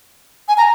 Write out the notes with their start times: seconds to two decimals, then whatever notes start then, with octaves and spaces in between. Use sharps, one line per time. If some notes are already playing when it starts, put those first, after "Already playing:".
0.48 G#5
0.57 A#5